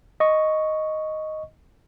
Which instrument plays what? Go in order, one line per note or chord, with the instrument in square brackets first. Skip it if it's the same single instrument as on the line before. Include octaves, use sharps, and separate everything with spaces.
[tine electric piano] D#5 C#6